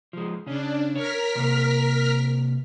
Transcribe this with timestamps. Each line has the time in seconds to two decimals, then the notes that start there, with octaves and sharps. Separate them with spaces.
0.13 F3 G#3
0.47 C#3 C#4 D4
0.96 A#4 C#5 F6 B6
1.35 C3 A#3